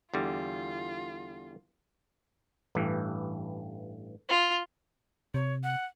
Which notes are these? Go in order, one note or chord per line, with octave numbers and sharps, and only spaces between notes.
E2 D3 G3 F4
A1 G2 E3
F4
C3 C#5
F#5